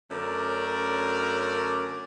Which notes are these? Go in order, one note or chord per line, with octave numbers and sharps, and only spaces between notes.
F#2 D3 A3 C#4 A#4 D5